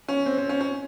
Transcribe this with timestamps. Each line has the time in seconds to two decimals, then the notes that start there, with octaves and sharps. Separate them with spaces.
0.08 C#4
0.26 C4
0.38 C4
0.49 C#4
0.61 C#4